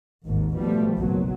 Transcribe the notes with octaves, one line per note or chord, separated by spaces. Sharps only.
G#1 D#2 G#2
B2 F3 G3 A3
F#1 B1 A#2 F#3